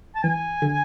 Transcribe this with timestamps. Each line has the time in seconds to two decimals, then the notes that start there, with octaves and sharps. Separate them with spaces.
0.15 A5
0.23 E3 G#5
0.62 D3